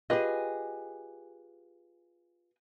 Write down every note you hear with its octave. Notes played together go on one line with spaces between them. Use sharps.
F4 G4 G#4 B4 D#5